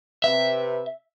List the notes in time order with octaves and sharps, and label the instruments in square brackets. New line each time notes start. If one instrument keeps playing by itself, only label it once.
[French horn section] C3 B4 [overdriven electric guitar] E5